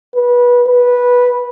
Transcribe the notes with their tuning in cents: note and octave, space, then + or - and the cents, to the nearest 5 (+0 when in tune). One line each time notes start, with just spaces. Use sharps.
B4 -20
B4 -10